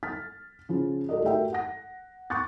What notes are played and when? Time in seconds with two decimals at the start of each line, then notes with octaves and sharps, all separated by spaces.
0.03 F6 A6 B6
0.69 C#3 F3 F4
1.09 F#4 A4 A#4 D5 D#5
1.23 A3 F#4 G4 A#4 E5 G5
1.53 F#5 A#6
2.30 C#6 D6 F#6 A6